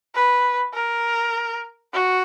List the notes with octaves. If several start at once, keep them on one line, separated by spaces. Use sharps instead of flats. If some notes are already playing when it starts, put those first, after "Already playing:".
B4
A#4
F#4